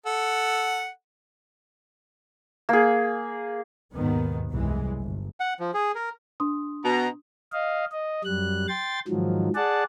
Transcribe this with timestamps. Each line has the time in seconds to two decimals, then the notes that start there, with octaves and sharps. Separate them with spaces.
0.06 A4 F#5
2.69 A#3 G#4
3.93 D#2 G#2 B2 D#3 B3
4.51 C2 F#2 E3 G#3
5.00 G1
5.40 F#5
5.60 F3
5.74 G#4
5.95 A#4
6.40 D4 C6 D#6
6.83 B2 A#5
7.52 D#5 F5
7.92 D#5
8.25 F#2 G3 F#6
8.68 G5 C6 A6
9.08 G#2 D#3 F3 F#3
9.55 G#4 D5 F#5 A5